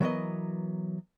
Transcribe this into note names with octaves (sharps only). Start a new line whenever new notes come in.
E3 F#3 B3 A#4 D#5